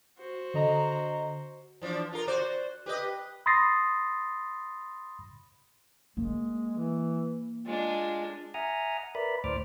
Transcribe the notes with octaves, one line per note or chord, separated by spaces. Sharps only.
F#4 C5
D3 D#5 A#5
E3 F3 D4
F4 A#4
F#4 C5 D5
G4 B4 D#5
B5 C6 D#6 A6 A#6 C7
G#3 A#3
E3
G#3 D4 F4
E5 F#5 G#5 A#5 D#6 F6
A#4 B4 D5 E5 B5
D2 A2 C5 D5 D6 F6